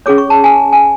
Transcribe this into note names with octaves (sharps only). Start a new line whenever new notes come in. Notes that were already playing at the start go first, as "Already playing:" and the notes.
C#4 G#4 C#5 D6
C#6
A5
G#5
G#5